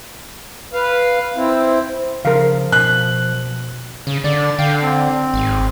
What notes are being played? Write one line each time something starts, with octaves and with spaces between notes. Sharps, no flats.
B4 F5
C4 E4
C#3 F3 A#4 F5
B2 F#6
C#3
D3 D5
D3 F5 G5
C4
G#1